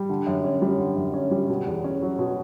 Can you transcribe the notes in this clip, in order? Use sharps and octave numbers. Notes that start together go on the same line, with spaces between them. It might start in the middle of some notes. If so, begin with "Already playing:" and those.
Already playing: G3
D3
F#2
C#4
G3
D3
F#2
C#4
G3
B2
E2
C#4
F#3
B2